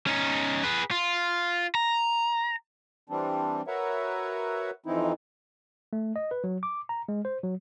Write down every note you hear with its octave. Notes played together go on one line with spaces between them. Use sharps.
C#4 D#4
G#4 B4
F4
A#5
E3 G3 C4 D4
F#4 A#4 B4 C#5 E5 F#5
F2 E3 C4 D#4 E4
A3
D#5
B4
F#3
D6
A#5
G#3
C5
F#3